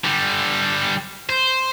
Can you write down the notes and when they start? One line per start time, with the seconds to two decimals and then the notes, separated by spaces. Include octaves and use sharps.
0.05 D3 G3
1.29 C5